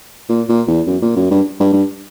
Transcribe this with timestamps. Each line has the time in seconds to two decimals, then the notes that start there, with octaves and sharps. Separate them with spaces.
0.29 A#2
0.49 A#2
0.68 E2
0.87 F#2
1.02 A#2
1.16 F#2
1.31 G2
1.60 G2
1.73 G2